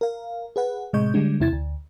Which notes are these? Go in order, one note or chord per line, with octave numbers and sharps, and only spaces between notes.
A#4 F5
G#4 B4 F#5
A2 C3 G#3 D#5 C#6 G6
D3 G3 G#3 D4
E2 C3 E4 G#6 A6
D2